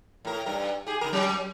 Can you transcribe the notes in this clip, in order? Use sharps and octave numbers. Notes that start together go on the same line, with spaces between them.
A2 A#4
G2 A#4
G4 G#4
C#3 A#4
F#3 C#4